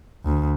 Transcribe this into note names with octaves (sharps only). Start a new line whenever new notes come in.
D2